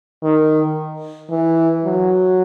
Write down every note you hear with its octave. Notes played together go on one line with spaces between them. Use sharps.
D#3
E3
F#3